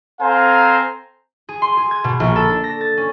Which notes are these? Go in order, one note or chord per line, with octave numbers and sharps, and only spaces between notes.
C4 A4 C5 F5 G#5 A#5
G#4
C6
G#4
G#6
B2
A#1
A4
D4
A#6
A6
C#4